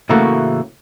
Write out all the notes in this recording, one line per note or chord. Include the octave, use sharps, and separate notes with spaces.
A2 C#3 E3 A3 A#3 F#4